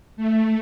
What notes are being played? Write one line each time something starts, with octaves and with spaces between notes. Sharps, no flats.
A3